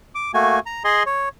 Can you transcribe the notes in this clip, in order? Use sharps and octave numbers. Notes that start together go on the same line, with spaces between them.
D6
A3 A#3 F#4 G#5
A#5
G#4 D#5 G#5 C6
C#5